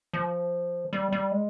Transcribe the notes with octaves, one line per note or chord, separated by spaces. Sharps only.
F3
G3
G3
G#3